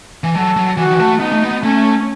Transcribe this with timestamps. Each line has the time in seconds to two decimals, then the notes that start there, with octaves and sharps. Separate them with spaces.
0.24 E3
0.35 F#3 A4
0.56 F#3
0.77 E3 F#4
0.84 D#3
0.92 E3
1.00 A3
1.20 B3 D#4
1.32 A3
1.44 B3
1.63 A3 C#4